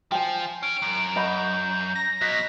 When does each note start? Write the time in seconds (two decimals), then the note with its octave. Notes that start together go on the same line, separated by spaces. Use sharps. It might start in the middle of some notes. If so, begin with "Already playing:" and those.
0.12 F3 G5 G#5
0.63 C#4 D7
0.82 F#2
1.16 D#5 F#5 B5 G6
1.95 A#6
2.21 B2 F#3 D#5 B6